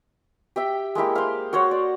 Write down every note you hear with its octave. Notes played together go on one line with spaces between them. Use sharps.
G4 E5 G5
G#3 A#3 E4 G4
C5 F5
F#4 C5 C#5 F#5
D5